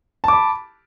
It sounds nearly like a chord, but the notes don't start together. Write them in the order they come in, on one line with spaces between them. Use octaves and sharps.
A5 D6 B5